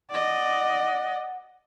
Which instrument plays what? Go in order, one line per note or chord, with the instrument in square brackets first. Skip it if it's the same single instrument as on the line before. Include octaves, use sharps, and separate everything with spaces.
[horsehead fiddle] D5 D#5 [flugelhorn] F#5